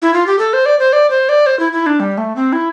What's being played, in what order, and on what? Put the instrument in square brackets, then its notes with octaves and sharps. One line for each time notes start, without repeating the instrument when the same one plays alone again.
[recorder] E4
F4
G4
A4
C5
D5
C5
D5
C5
D5
C5
E4
E4
D4
G3
A3
C4
E4